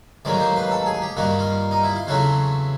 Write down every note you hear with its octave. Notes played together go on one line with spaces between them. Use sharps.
A1 G#2 D#3 F#3 A#3 D5
C5
B4
A4
G#4
G4
G2 D#3 G3 A#3 F#4
F4
D#4
E4
F4
E2 C#3 F#3 A3 C4 F#4